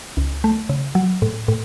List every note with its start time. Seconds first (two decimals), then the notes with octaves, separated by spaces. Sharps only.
0.17 C#2
0.44 A3
0.69 C#3
0.95 F#3
1.22 A2
1.48 A2